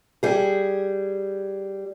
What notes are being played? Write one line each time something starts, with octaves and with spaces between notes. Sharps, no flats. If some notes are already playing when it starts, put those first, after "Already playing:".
G3 G#4